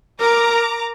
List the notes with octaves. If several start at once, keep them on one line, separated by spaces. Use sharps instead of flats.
A#4 A#5 D6